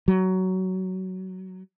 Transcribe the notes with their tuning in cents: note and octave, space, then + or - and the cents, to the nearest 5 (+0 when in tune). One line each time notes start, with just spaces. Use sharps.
F#3 +15